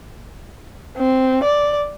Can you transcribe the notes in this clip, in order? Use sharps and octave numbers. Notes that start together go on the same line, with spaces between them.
C4
D5